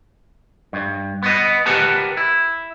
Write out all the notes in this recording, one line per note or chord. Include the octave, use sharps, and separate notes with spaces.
G2
B3 D#5
G4 A#4 B4 F#5 A5 A#5
E4